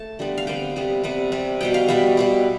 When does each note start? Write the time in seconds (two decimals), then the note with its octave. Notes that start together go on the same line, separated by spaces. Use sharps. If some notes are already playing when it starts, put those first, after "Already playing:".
Already playing: A3 A5
0.19 D3 G3 B3
0.38 F5
0.47 C3 G3 B3 G5
0.76 C3 G3 B3
1.04 C3 G3 B3
1.32 C3 G3 B3
1.61 B2 G3 B3 G5
1.74 F5
1.88 B2 G3 B3 E5
2.17 B2 G3 B3